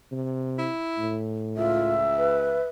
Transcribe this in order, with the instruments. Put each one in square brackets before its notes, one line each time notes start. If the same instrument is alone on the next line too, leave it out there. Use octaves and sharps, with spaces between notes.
[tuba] C3
[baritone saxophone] E4
[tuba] A2
[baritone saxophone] C#2 [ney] F4 [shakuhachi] E5
[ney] B4